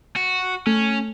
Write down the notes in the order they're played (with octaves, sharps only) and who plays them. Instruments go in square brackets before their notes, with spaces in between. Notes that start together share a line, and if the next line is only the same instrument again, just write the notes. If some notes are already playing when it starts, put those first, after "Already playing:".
[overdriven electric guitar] F#4
[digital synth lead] A3 [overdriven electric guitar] C#4